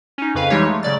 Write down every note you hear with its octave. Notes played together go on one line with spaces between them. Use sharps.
C#4 D#4
F2 C#3 B4 F5
E3 G3 G#3 D#4 G4 C#5
G#3 A3
C#3 F#3 D5 A6